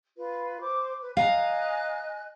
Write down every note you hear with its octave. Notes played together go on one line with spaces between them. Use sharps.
F4 B4
C5 D6
B4
D#5 F5 G#5 A#5 F#6